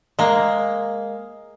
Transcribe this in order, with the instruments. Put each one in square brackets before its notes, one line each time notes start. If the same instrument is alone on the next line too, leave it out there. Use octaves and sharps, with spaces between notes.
[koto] G#3 A#3